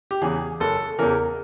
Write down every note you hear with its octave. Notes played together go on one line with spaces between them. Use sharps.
G4
E2 C#3 E3 G#4
F#1 A4
E2 C#3 E3 A#4